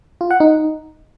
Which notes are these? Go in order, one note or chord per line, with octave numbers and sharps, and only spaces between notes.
F4
F#5
D#4